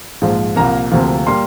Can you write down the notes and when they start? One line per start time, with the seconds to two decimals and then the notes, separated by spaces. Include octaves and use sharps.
0.22 A#1 G#2 F3 G#3
0.56 C2 A#2 F3 A#3 A#5
0.91 D2 C3 F3 A#3
1.27 A#2 G3 A#3 C6